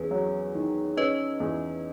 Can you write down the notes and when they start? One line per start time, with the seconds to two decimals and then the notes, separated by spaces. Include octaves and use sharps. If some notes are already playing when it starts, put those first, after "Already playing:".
Already playing: E2 C#4 G#4 B4
0.11 F#3
0.55 D#3
0.97 C#4 B4 D#5
1.40 E2